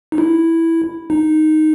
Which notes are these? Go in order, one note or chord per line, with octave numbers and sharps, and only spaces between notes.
D#4
E4
D#4